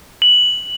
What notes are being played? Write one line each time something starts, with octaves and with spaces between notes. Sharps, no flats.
F#7